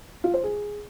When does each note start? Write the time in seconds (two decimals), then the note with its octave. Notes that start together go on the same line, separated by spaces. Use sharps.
0.24 F4
0.34 C5
0.44 G#4